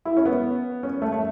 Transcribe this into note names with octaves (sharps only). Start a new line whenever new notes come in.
E4
C#4
B3
C#4
A3
A3